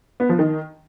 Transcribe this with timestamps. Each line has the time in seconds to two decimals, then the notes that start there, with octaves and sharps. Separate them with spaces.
0.20 B3
0.29 F3
0.39 D#3